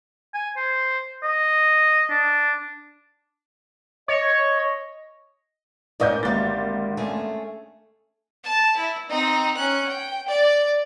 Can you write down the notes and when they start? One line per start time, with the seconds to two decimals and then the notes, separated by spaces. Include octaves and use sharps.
0.34 G#5
0.56 C5
1.23 D#5
2.10 D4
4.08 C#5 D#5
6.00 G#2 A#3 C#4 D5 D#5 G6
6.23 G#1 D2 G3 A#3 A6
6.97 A3 C#4 G#4
8.44 A5
8.76 E4
9.09 C4 D#4
9.57 C#4 F#6
9.88 G5
10.28 D5